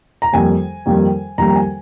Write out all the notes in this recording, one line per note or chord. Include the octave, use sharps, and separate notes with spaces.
A#5
F2 D#3 G3 A#3 G#5
F2 D#3 G3 A#3
F2 D#3 G3 A#3 A#5
A#5
G#5